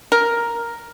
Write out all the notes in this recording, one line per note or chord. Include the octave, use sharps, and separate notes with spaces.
A#4